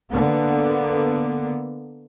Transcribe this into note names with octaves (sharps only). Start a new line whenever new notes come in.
D3 A#3 B3